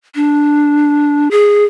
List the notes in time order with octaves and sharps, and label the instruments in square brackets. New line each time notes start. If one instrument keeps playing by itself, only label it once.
[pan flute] D4
G#4